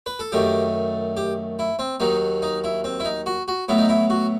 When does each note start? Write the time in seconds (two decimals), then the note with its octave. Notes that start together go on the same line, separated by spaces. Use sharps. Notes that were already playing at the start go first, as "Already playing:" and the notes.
0.06 B4
0.19 A4
0.32 F#2 D#3 A3 G4
1.17 G4
1.59 E4
1.79 C4
2.00 D#2 D#3 F#3 D#4
2.42 D#4
2.64 E4
2.84 C4
3.00 E4
3.05 D#4
3.26 F#4
3.48 F#4
3.68 A2 F#3 B3 E4
3.78 D#4
3.89 E4
4.10 F#4